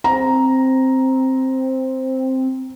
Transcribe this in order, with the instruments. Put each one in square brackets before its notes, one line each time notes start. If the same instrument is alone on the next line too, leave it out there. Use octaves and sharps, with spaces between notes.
[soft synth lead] C4 [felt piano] A#5